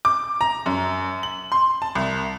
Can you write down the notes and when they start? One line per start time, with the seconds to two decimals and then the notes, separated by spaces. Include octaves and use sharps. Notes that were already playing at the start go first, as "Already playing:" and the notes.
0.05 D6
0.41 A#5
0.66 F#2
1.23 F#7
1.52 C6
1.82 A5
1.95 C2